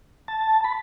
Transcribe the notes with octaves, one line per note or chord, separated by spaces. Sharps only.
A5
B5